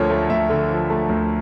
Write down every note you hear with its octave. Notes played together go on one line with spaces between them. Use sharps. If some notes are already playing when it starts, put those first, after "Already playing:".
Already playing: D2 D3 F3 A#4 C#5
A3
D2 E5
D3
F3
A3
D2